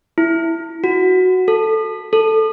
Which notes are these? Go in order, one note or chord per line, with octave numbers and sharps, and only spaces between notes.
E4
F#4
A4
A4